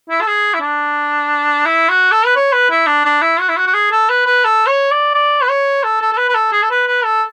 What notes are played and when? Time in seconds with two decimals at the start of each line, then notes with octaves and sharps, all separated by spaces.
0.09 E4
0.21 A4
0.27 G#4
0.54 E4
0.61 D4
1.66 E4
1.89 F#4
2.11 A4
2.26 B4
2.36 C#5
2.52 B4
2.70 E4
2.87 D4
3.05 D4
3.22 E4
3.40 F#4
3.49 E4
3.56 F#4
3.67 F#4
3.74 G#4
3.91 A4
4.09 B4
4.26 B4
4.45 A4
4.67 C#5
4.91 D5
5.14 D5
5.42 B4
5.49 C#5
5.84 A4
6.01 A4
6.12 A4
6.17 B4
6.29 B4
6.35 A4
6.52 G#4
6.62 A4
6.71 B4
6.87 B4
7.05 A4